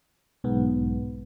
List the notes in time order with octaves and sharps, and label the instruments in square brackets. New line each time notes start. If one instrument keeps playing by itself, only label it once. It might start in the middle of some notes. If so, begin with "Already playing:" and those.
[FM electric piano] B1 G#2 B3